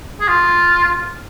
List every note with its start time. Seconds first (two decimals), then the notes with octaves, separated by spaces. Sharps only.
0.21 G#4
0.28 F4